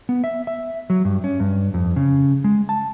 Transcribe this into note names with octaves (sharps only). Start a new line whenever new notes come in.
B3
E5
E5
F#3
G2
C#4
G2
F2
C#3
G#3
A5